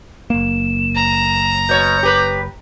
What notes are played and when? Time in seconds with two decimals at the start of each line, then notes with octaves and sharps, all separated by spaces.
0.30 F#1 A#3 E7
0.95 A#5
1.69 B2 C#5 G6
2.03 G4 B4